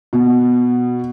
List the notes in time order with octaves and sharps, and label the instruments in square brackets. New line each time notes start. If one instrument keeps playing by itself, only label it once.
[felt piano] B2